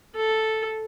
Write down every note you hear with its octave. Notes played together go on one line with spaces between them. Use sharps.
A4